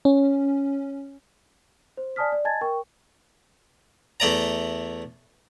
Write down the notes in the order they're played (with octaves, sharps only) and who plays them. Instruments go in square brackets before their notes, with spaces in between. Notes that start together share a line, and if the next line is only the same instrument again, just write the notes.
[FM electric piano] C#4
[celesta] C5
D5 G#5 A5 D#6 F6 B6
D5
D#5 G#5 A5 G#6 A6
A#4 G5 C#6
[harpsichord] E2 A3 D5 A#5